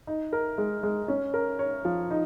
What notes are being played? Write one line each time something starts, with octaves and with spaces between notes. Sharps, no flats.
D#4
A#4
G#3
G#3
C#4
A#4
C#5
F3
D#4